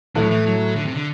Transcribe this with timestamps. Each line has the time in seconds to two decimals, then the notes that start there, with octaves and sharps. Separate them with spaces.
0.15 A2 E3 A3
0.22 F#3
0.30 E3
0.46 F#3
0.76 D3
0.85 C3
0.94 D3